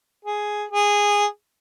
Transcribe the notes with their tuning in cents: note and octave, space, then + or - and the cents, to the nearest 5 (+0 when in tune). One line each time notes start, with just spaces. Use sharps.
G#4 +5
G#4 -15